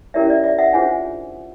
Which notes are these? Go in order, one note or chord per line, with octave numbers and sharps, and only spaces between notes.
C#4 E4 G4 A#4 C#5 D5 E5
D5 E5
D5 E5
E5 F#5
D4 F4 G#4 C5 F#5 G#5